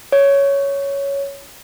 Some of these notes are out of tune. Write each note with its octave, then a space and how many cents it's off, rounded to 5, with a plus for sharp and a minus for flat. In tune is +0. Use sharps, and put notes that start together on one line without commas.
C#5 +5